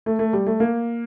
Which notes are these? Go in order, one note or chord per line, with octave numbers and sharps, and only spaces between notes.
A3
A3
G3
A3
A#3